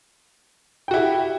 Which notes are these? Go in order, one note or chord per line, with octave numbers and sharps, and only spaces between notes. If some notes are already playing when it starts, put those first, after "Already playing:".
E4 F#4 G4 G5